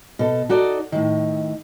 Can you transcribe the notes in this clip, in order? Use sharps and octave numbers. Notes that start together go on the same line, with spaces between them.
B2 A4
D#4 F#4 A4 D5
A2 D#3